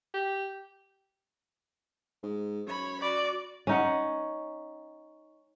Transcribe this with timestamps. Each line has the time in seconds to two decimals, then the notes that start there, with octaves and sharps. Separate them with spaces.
0.14 G4
2.23 G#2
2.67 F#2 C#5 B5
3.02 F#4 D5
3.67 C#4 D#4 F#5